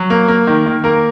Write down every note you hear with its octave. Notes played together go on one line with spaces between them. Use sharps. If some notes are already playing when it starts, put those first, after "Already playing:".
Already playing: F#3
A#3
A#3
D#3
D#3
A#3 A#4